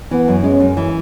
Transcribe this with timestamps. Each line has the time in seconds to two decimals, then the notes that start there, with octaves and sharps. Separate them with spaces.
0.11 E3 B3
0.28 F#2
0.44 G#3 C#4
0.60 F#2
0.77 E3